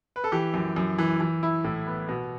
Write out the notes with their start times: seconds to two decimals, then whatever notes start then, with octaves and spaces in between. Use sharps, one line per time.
0.16 B4
0.24 A4
0.32 E3 G4
0.54 F#2
0.76 F#2
0.98 E3
1.20 E3
1.43 E4
1.64 A2
1.87 B3
2.09 B2